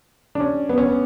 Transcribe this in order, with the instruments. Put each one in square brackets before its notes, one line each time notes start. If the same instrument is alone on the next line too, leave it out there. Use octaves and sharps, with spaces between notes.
[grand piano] D4
C#4
B3
C#4
B3